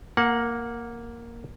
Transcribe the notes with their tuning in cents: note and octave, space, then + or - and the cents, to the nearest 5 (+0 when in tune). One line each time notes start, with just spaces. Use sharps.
A#3 +0 F#5 -20